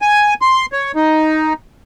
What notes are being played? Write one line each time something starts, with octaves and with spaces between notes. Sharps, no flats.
G#5
C6
C#5
D#4